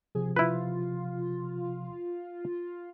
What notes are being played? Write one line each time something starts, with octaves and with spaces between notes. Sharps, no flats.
C3 F3 G#4
E4 F4 B4